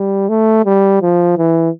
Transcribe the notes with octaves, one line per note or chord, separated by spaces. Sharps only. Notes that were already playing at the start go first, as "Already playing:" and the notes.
Already playing: G3
A3
G3
F3
E3